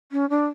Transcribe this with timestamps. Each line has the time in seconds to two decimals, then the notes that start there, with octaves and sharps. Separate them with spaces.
0.12 C#4
0.30 D4